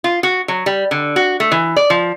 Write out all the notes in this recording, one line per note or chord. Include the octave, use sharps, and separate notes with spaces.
F4
F#4
F#3
G3
D3
F#4
A3
E3
D5
F3